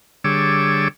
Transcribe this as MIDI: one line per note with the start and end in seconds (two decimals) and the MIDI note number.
0.24 0.88 50
0.24 0.88 55
0.24 0.88 68
0.24 0.88 73
0.24 0.88 86
0.24 0.88 88